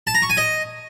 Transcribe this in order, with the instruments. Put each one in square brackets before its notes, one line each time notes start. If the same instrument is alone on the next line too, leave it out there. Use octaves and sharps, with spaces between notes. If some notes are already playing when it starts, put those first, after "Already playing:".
[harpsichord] A5
A#5
C#6
G#5
D#5